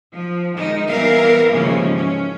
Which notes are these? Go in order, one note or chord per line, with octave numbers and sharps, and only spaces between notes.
F3
D#3 G#3 D#4
E3 G3 B3 A#4 E5 F5
D#2 G#2 C#3 E3 F3 C#4
C#4